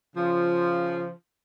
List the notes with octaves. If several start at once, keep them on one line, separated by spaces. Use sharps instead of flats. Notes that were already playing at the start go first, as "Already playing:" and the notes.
C#3 F3